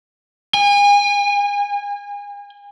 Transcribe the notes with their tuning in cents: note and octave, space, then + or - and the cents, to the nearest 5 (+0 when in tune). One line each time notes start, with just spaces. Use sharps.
G#5 -35